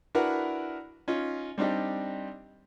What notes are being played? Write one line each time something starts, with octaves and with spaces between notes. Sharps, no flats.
D4 E4 F#4 A#4 B4
C#4 D#4 F4
G3 C4 D4 D#4 G4